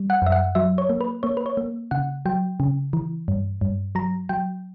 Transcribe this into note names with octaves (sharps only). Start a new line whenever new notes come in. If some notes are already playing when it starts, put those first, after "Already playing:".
Already playing: G3
F#5
F#2 E5
F#5
F#3 E5
C#5
A#3
B4
A#3 C#5
B4
C#5
A#3
C#3 F#5
F#3 G5
C#3
E3
G2
G2
F#3 A#5
F#3 G5